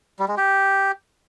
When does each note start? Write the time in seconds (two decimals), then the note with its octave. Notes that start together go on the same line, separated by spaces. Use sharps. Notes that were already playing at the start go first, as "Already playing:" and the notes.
0.19 G3
0.28 G#3
0.37 G4